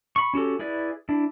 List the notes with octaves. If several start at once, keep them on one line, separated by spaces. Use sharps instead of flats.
B5 C#6
C#4 F#4 G4 A4
E4 G#4 B4 D5
D4 E4